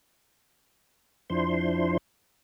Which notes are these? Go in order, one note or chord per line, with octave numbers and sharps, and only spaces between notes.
F2 F3 D4 E4 C5 C6